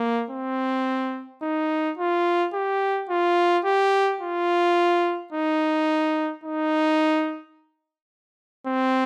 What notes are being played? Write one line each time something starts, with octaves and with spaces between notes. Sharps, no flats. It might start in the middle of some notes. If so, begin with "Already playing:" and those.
Already playing: A#3
C4
D#4
F4
G4
F4
G4
F4
D#4
D#4
C4